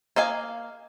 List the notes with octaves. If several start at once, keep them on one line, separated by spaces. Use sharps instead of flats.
A#3 D#5 F5 G#5